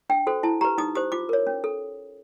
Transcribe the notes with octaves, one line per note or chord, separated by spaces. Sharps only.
D4 G5
F#4 A4 C5
E4 A5
G4 B4 A#5
D#4 D#6
G4 C5 D#6
F4 D6
A#4 C#5
C#4
A4